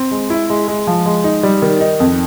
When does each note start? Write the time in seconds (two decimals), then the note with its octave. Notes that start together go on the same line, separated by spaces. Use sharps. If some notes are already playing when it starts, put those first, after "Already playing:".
Already playing: C4
0.11 G#3
0.30 E4
0.50 G#3
0.68 G#3
0.87 F3
1.06 G#3
1.24 D#4
1.43 G3
1.62 D#3
1.81 D#4
2.00 F2